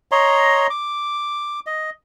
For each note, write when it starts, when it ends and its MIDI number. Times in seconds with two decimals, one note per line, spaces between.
0.12 0.67 73
0.12 0.67 75
0.12 0.67 82
0.12 0.67 84
0.70 1.60 86
1.66 1.90 75